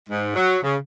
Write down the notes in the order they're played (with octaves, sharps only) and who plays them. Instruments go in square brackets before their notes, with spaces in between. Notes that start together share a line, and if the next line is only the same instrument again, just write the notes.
[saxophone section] G#2
F#3
C#3